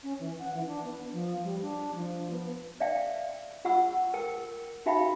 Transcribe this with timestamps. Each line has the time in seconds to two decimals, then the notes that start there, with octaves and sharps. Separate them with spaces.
0.03 C#4
0.20 E3
0.39 F#5
0.54 E3
0.67 D4
0.85 B3
1.12 F3
1.43 G3
1.61 D4
1.95 F3
2.31 B3
2.80 D5 E5 F5 G5
3.65 F4 F#5 C#6 E6
4.14 A#4 G5 E6
4.86 D#4 F#4 E5 F5 G5 B5